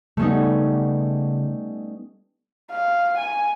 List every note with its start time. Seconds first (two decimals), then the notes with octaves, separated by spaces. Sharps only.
0.17 C#3 G3 A3 B3 C#4 D#4
2.71 F5
3.17 G#5